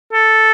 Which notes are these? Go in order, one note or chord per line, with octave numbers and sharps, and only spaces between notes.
A4